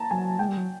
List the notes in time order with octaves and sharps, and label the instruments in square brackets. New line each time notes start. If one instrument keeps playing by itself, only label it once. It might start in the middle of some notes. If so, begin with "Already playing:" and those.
Already playing: [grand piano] A5 A#5
[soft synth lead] F#3 [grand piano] G#5
[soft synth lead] G#3 [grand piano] G5
[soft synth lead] G3
F#3